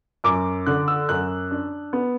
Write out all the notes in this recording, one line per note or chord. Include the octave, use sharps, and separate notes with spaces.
F#2 D6
D3 F#6
E6
F#2 F#6
D4
B3